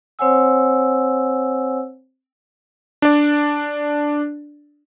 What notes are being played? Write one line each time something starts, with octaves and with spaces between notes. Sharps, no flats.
C4 C5 C#5 F#5 G#5 E6
D4 D5